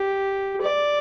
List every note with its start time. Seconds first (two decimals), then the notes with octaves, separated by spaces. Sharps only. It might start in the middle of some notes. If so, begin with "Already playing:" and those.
Already playing: G4
0.61 D5